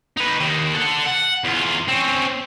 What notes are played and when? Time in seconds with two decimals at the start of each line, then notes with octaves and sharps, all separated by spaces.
0.17 D#4 B4
0.40 D#2 D#3
0.75 A4 F#5
1.07 F#5
1.44 E2 F4
1.88 C4 C#4